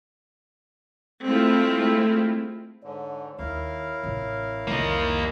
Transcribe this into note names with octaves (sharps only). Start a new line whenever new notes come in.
G#3 A3 C4 E4 F4
G#2 D3 C#5
D#2 E4 A#4 F5
A1 C3
C2 F2 A#3 D#5